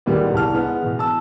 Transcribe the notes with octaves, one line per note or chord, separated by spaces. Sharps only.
D#2 A#2 G3 G#3 B3
C2 A5 F6
G#3 B3
B2 E3
A5 E6